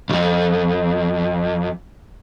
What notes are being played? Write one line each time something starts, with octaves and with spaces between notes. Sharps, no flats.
B1 F2